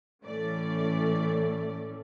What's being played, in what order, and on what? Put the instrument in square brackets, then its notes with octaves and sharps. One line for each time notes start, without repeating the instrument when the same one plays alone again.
[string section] A2 E3 A3 C#4 D5